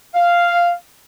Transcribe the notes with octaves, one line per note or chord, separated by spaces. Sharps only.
F5